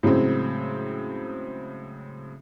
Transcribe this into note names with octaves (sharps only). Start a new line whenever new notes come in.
A2 C#3 F#3 G#3 C4